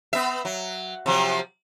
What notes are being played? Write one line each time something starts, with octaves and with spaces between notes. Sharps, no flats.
B3 E5
F#3
C3 F3 F#3